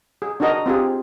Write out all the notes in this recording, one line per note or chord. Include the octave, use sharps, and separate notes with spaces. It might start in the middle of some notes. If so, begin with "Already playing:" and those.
G#4
D4 D#4 F#4 A#4 D#5 A#5
C4 F4 G4 G#4